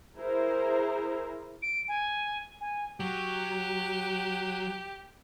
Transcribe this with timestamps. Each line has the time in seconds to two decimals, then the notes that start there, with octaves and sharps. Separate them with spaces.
0.16 E4 G#4 A#4 C5 A#5
1.62 D7
1.88 G#5
2.61 G#5
3.00 F#3 G4